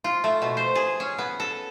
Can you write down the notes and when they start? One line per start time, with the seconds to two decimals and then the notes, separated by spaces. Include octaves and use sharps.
0.04 F4
0.24 A3
0.42 B2
0.57 C5
0.75 G#4
1.00 C#4
1.18 B3
1.40 A4